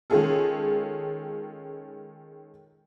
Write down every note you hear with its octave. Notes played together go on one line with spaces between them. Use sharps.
D#3 G#3 C#4 F4 G#4 A4